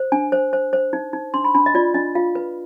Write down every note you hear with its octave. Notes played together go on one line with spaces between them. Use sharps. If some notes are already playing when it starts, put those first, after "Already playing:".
Already playing: C5
D4 G#5
C5
C5
C5
D#4
D#4
D4 C6
B5
D4 B5
D#5
F4 D5
D4 D#5
F4 F5
B4